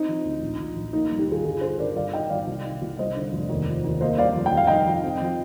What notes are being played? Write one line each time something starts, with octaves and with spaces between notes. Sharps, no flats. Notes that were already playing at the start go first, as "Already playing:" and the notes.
Already playing: C4 D#4
F3
D2
A#1
F3
A#1
A#3 D#4
D#4
G3
D#4 G4
D#2 F4 G#4
G1 F4 G#4
D3 G#4 C5
G1 A#4 D5
G1 D5 F5
D#3 D#5 G5
G1 D5 F5
C2
D#3
C2
G3 C5 D#5
D3
F1
D#2
F3
D#2
A#3 C5 D#5
G3 D5 F5
F2
G5
G3 F5
D#3 D#5 G5
F2
C4
F3